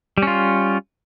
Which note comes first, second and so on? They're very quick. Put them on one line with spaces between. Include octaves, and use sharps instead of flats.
G3 C#4 F4